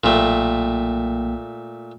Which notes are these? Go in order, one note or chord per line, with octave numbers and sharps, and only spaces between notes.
B1 A#2 A3 A#3 G5